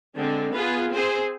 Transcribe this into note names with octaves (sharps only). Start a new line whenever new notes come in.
D3 G#3 C4
B3 F4 G#4 B4
C4 G#4 C5